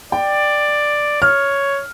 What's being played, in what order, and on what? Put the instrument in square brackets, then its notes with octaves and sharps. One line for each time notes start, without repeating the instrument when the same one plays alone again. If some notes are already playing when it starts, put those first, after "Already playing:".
[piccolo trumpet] D5 [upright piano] G5
[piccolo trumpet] C#5 [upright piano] F6